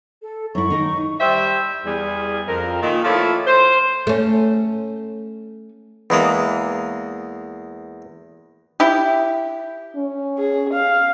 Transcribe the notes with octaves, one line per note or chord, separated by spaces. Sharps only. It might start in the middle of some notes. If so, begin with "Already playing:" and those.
A4
F#2 E4 C#6
D#3 D#4 A#4
G3 C5 E5
E2 G3 G#4
F2 A#4
A#2 D#3
F3 A3 A#3 E4 A4 C#5
C5
A3 C#4
E2 E3 G#3 A#3 D#6
E4 G4
C#4
G#4
F5